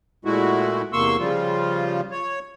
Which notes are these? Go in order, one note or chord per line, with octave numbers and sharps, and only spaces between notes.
A#2 G#3 A3 E4 F#4
E2 C3 A#3 C6 C#6 E6
C#3 F3 G3 F4
C#5